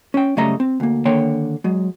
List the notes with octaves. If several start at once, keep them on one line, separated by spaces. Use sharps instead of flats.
C#4 G5
F#2 C#3 G3 A3 D#5 A#5
C4
D2 A#3
D3 D#3 A#3 C#5 G5 C6
F#3 G#3